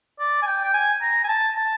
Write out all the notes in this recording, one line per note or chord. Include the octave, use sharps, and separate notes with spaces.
D5
G#5
G5
G5
G#5
A#5
G#5
A5
A5